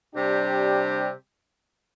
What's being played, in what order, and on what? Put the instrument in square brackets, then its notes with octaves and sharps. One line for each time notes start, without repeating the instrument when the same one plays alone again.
[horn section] C3 G3 D4 G4